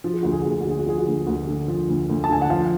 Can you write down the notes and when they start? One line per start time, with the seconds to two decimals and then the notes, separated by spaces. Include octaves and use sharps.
0.04 F3 F#4
0.13 G#4
0.23 D2 F#4
0.32 G#4
0.42 D2 F#4
0.51 G#4
0.60 F#4
0.66 D3 G#4
0.79 F#4
0.86 F3 G#4
0.98 F#4
1.07 D2
1.27 D2 F#4
1.47 D3
1.68 F3
1.89 D2
2.09 D2
2.24 A5
2.30 D3 G#5
2.42 F#5
2.50 F3 F5